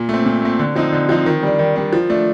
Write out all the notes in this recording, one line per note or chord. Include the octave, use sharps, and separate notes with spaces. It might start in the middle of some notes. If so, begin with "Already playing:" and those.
Already playing: A#2
A3 C4
A#2
A3 C4
D3
F3 C4 D#4
D3
F3 C4 D#4
D#3
G3 D4
D#3
G3 D4
F3
A3 D4